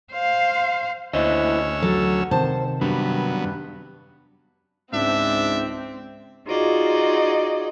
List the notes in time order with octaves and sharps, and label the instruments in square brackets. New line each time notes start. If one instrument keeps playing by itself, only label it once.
[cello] C5 F5
[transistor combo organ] D2 C#4 E6 [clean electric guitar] E4 C5 D#5
[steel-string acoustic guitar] F#3 [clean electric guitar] A4
[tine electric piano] C3 D#3 C4 [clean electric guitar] C5 [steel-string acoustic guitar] A5
[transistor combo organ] F#2 B3 [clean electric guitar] G3 D4
[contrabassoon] C#2 [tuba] G#2 [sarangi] C4 [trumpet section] D4 E5
[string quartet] D#4 F4 F#4 G#4 D5 D#5